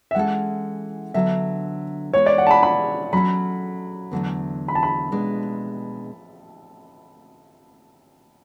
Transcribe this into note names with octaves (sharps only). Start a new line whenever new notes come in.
E5
E3 G#3 C#4 E4 A4 F#5
D3 F#3 B3 D4 E5
E3 G#3 B3 C#5
D5
F#5
A5
B5
B5
F#3 C#4 F#4 A4 B5
E2 D3 F#3 A3
B5
A5
B5
B2 G#3 D4